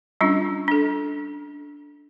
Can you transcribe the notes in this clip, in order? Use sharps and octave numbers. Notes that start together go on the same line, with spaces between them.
G3 C#4 D4 F4
D4 A4